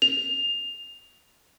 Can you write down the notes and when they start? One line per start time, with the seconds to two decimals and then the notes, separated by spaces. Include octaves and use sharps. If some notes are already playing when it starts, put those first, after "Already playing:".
0.02 F7